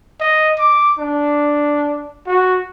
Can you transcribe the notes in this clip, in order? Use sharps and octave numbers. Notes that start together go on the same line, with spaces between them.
D#5
D6
D4
F#4